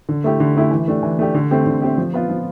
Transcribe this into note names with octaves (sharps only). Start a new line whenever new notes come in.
D3
A3 E4 G4
D3
A3 E4 G4
E3
A3 D4 G4
E3
A3 D4 G4
D3
A3 C4 G4
D3
A3 C4 G4
F3
B3 F4
F3